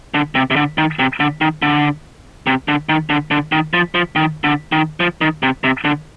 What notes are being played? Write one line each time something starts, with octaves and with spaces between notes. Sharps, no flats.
D3
C3
C3
D3
D#3
C3
D3
D#3
D3
C3
D3
D#3
D3
D3
D#3
F3
F3
D#3
D3
D#3
F3
D#3
C3
C3
D3